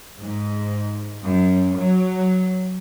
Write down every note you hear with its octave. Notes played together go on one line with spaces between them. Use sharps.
G#2
F#2
F#3